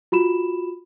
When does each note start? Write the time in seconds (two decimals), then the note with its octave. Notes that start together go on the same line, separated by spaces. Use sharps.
0.12 F4 F#4 B5 E7